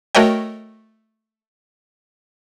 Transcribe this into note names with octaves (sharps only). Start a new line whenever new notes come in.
A3 F#4 A#4 C#5 D#5 G5